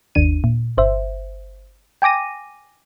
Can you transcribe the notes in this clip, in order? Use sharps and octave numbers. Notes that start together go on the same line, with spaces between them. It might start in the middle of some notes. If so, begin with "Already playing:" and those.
G1 D#2 D4 D#7
A#2
G1 C5 E5
G5 G#5 D6 A#6 D#7